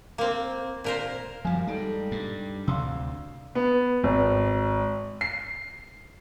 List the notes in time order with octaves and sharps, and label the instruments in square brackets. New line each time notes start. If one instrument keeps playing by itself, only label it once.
[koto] A#3 C4
A#2 A#4 C5
[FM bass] F#2 [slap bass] F3 G3 [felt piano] F5 G#5
[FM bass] G3 [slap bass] G#3 [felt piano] D#4 A4 D7
[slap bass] G2
[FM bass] D2 [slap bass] C3 [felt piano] F5 C6 E6
[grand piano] B3
G#1
C7